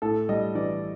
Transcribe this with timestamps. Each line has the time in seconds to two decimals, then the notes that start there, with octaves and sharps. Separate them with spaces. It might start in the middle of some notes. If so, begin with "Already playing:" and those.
0.02 A2 A4
0.29 G3 D#5
0.55 E3 D5